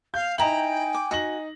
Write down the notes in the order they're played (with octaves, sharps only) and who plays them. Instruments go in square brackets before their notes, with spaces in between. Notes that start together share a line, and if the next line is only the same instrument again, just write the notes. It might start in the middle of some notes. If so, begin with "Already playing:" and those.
[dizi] F5 [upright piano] G6
[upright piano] D#4 F#7 [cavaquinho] E4 A#5 [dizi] G5 [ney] G#5
[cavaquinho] D6
[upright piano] D#4 A#6 F#7 [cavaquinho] F#4